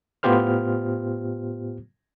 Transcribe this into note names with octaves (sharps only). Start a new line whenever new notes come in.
A2 B3 F4 G4 C5 F6